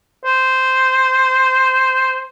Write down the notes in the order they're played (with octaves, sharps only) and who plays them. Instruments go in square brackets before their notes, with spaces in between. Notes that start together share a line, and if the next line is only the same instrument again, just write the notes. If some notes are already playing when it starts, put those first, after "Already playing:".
[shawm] C5